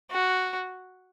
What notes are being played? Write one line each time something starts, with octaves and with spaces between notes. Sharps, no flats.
F#4